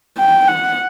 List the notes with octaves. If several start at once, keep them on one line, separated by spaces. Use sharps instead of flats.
G5
F#5